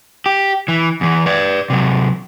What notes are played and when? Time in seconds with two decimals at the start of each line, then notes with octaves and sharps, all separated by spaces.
0.26 G4
0.68 E3
1.01 E2 E3
1.26 B4 D5
1.70 C3 F#3